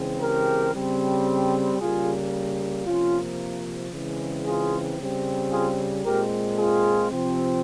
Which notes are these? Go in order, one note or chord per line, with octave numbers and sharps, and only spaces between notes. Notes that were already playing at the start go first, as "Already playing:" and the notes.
Already playing: C#3 E3 G#3 C4
G4 A#4
C#3 G3 C4
C#3 G3 A#3 F4 G#4
C3 F3 A#3 C#4 F4
C#3 E3 G#3 C4
F4 G#4
C#3 G3 C4
F4 G#4
A#2 G#3 C4 G4 A#4
F4 G#4
C3 F3 C4